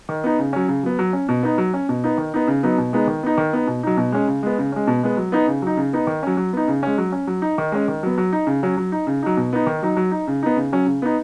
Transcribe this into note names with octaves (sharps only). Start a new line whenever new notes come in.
D#3
B3 D#4
C#3
F#3 C#4
C#3
F#3 B3
F#3
C#4
B2
B3 D#4
F#3
C#4
B2
B3 D#4
D#3
B3 D#4
C#3
F#3 B3 D#4
B2
G#3 B3 D#4
D#3
B3 D#4
D#3
B3 D#4
B2
F#3 D#4
B2
G#3 C#4
C#3
G#3 B3
C#3
G#3 C#4
B2
G#3 B3
F#3
B3 D#4
C#3
F#3 D#4
C#3
B3 D#4
D#3
F#3 C#4
F#3
B3 D#4
C#3
G#3 C#4
F#3
C#4
F#3
D#4
D#3
G#3 C#4
D#3
F#3 B3
F#3
D#4
C#3
F#3 C#4
F#3
D#4
C#3
F#3 D#4
B2
B3 D#4
D#3
F#3 D#4
F#3
D#4
C#3
B3 D#4
C#3
F#3 C#4
C#3
B3 D#4